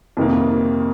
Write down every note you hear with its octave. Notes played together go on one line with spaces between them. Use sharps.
F2 C3 D#3 A#3